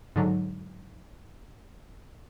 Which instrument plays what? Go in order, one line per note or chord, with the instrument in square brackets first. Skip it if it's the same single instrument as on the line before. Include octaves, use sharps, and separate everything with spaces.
[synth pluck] G#2 D3 F#3